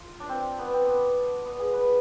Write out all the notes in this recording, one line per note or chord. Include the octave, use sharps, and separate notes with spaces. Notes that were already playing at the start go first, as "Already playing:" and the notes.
Already playing: F4
D4
C4
B3
C4
B3
B3
G#4
B4